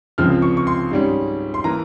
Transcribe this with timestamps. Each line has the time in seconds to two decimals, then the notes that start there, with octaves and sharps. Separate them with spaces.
0.18 C#2 C#3 F3 C4 F6
0.42 C#6
0.57 C#6
0.67 C6
0.91 G#2 G3 C#4
1.54 C6
1.64 E3 A#3 A#5